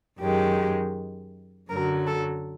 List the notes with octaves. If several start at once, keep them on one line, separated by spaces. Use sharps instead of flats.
F#2 D#3 G#3 G4
F#2 D3 F#3 A#4
A4